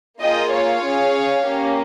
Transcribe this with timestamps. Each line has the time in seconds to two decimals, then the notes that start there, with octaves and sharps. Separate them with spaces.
0.21 A#3 F4 G#4 D#5 G5
0.52 C#5 F5
0.83 C#4 G#4
1.44 A#3 C#4 G4